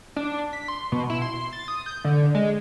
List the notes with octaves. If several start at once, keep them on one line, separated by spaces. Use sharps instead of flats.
D4
B6
C6
B2
E4
C6
A6
D#6
G6
D3
G#3